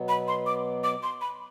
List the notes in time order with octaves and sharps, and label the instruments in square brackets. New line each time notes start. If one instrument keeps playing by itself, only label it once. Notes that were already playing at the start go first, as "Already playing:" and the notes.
Already playing: [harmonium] B2 F#3 B3
[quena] B5
C6
D6
D6
C6
B5